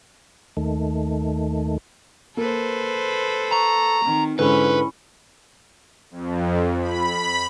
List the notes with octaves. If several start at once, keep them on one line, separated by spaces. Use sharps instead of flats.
D#2 D#3 A3
A#3 A4 B4 C5
A#5 C#6
D#3 C4 D#4
G#2 D3 C#4 E4 B4 B5
F2
B5